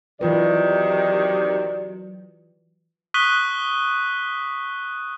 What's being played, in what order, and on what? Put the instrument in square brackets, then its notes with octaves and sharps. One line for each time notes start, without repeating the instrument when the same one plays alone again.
[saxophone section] C3 D#3 [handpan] E3 F4 B4 [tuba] F#3 [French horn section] G4 D5
[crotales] C#6 D#6 F#6 B6 D#7 G7